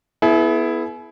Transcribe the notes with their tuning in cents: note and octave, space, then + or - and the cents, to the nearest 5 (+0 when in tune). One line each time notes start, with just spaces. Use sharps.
B3 +0 E4 +0 G#4 +45